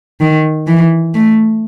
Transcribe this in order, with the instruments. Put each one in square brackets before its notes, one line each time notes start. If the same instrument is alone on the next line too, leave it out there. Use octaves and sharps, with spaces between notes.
[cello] D#3
E3
A3